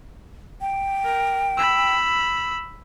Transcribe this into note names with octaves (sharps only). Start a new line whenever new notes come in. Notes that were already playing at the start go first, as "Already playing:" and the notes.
G5
A#4
B5 E6